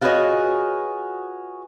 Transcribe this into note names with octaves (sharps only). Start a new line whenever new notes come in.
F4 F#4 G#4 B4 C#5 D#5